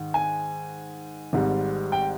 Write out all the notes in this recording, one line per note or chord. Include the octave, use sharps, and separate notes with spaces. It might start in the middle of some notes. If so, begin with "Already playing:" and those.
Already playing: G#2 D#3
G#5
G#1 G#2 G3
G5